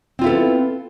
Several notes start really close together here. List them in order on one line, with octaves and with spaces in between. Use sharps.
C4 F4 E4 A4 B3